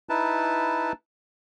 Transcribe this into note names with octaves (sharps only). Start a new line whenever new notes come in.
D#4 E4 B4 A5